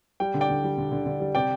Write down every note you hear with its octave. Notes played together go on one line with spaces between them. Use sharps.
G3 G5
D3
D5 G5
D3
G3
D3
D3
D3
G3
C3 D5 G5